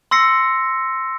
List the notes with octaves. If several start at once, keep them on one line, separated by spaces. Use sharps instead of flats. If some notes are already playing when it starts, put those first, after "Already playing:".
C6 E6 A#6 C7 C#7